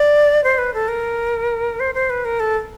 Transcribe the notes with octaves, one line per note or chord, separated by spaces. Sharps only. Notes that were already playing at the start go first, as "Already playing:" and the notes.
Already playing: D5
C5
B4
A4
A#4
C5
C5
B4
A#4
A4